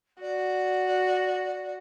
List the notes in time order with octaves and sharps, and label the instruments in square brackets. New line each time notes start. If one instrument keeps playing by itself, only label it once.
[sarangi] F#4 [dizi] D5